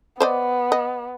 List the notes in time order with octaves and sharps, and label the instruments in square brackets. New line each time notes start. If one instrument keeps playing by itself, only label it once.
[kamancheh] B3 [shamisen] C5 D5 D#5
[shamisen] D#5